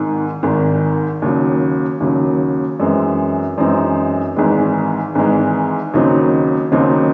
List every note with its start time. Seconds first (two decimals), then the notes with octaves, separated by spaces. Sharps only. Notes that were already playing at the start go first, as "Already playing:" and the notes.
Already playing: G#1 G#2 D#3
0.43 G#1 G#2 D#3
1.22 D#2 C#3 F#3
2.00 D#2 C#3 F#3
2.80 F#2 E3 G#3 C4 D#4
3.58 F#2 E3 G#3 C4 D#4
4.36 G#1 G#2 E3 G#3
5.15 G#1 G#2 E3 G#3
5.94 D#2 C#3 F#3 C4 D#4
6.72 D#2 C#3 F#3 C4 D#4